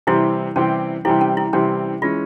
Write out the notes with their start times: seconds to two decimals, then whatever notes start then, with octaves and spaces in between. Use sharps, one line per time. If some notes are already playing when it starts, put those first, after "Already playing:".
0.07 C3 E3 G3 C4 E4 G4
0.56 C3 E3 G3 C4 C#4 G4
1.05 C3 E3 G3 C4 E4 G4
1.21 C#4
1.37 E4
1.53 C3 E3 G3 C4 C#4 G4
2.02 E3 G#3 C#4 F4